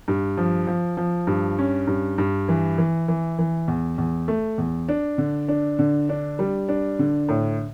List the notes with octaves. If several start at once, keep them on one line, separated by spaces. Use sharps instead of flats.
G2
F3
F3
F3
G2
C#4
G2
G2
E3
E3
E3
E3
E2
E2
A3
E2
D4
D3
D4
D3
D4
G3
D4
D3
A2